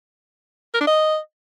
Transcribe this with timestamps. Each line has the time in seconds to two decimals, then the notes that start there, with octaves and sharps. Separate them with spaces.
0.74 A#4
0.81 D4
0.87 D#5